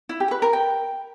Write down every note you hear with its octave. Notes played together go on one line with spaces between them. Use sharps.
E4
G4
B4
A#4
G5